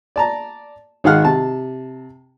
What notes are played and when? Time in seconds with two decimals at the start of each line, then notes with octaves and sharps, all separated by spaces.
0.16 D5 A5 A#5
1.04 G#1 D#3 G#4 F5 F#5 F6
1.25 C3 A5